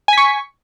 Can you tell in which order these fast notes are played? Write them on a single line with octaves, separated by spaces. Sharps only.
G#5 B6 C#6